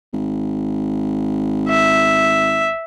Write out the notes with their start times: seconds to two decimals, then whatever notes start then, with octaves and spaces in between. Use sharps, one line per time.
0.13 G#1
1.69 E5